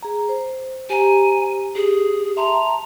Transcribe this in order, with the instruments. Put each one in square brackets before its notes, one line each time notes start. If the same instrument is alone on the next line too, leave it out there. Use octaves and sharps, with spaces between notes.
[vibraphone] G#4 A#5
C5
[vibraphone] G4 C5 A#5 [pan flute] G#5
[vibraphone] G4 [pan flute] G#4
[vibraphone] E5 A5 C6 [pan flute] A#5